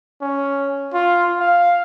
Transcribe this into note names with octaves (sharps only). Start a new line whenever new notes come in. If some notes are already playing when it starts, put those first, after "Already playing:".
C#4
F4
F5